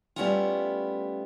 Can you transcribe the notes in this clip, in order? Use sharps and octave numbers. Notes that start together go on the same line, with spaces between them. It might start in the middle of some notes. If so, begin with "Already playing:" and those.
G3 A3 B3 C#4 E4 F4